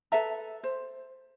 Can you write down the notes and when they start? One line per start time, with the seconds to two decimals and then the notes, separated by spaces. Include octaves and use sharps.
0.12 A4 B4 E5 A#5
0.64 C5